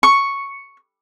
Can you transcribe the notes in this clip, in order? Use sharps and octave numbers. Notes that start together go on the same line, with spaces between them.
C#6